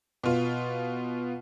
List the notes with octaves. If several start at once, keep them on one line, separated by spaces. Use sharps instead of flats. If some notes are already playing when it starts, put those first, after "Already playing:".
B2 F4